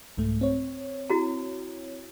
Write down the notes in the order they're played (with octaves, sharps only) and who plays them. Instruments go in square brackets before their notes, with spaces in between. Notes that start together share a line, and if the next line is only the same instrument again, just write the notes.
[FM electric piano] C2 G#2 A3
C4 C#5
[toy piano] E4 F#4 A#5